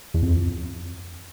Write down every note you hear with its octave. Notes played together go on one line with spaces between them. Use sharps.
E2
F2